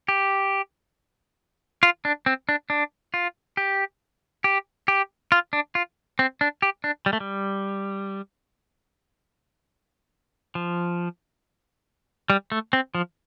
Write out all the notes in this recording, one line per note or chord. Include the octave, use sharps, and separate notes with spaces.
G4
F4
D4
C4
D4
D4
F4
G4
G4
G4
F4
D4
F4
C4
D4
G4
D4
G3
A3
G3
F3
G3
A3
C4
F3